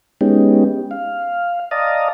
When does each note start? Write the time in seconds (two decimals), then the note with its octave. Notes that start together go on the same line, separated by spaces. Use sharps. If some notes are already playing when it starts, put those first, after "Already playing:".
0.21 G#3 B3 C#4 D#4 G4
0.91 F5
1.71 D5 D#5 F5 A5 A#5 D#6